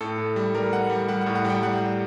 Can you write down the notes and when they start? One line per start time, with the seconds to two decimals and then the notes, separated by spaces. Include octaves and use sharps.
0.01 A2 A4
0.18 A2
0.36 G3
0.55 G3 A#4
0.72 G3 F#5
0.90 G3
1.09 G3 F#5
1.21 A2 F#5
1.35 F#5
1.45 G3 G5
1.63 G3 F#5
1.81 G3